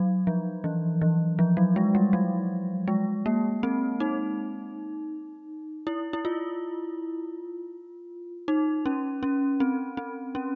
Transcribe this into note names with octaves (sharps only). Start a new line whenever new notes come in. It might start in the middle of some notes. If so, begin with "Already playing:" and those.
Already playing: F#3
F3
E3
E3
F3
F#3
G#3
G3
F#3
G#3
A#3
C4
D#4
E4
E4
F4
D#4
C#4
C#4
C4
C4
C#4